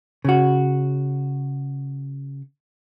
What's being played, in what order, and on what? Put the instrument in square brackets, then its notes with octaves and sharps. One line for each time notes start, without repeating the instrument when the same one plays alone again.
[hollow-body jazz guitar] C#3 F#4